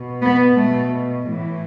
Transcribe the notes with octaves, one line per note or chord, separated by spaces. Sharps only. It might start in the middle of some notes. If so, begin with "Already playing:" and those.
Already playing: B2
B3
B2 A3
A2 E3